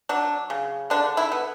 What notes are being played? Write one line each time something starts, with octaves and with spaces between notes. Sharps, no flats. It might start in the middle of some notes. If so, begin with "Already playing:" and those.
F#3 D4
C#3
D3 D4
E4
B3